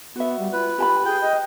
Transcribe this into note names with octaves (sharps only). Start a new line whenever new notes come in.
B3 F#4 E5
G3
F4 B4
F4 G4 A5 B5
G#4 G5
D#5